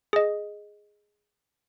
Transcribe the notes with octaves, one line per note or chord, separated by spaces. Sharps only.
G#4 D#5